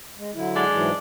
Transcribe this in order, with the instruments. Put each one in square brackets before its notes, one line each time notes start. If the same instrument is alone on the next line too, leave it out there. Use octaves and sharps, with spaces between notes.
[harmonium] G#3
D3 F#3 E4
[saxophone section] G#3 D4 D5
[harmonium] G#2 E3 F#3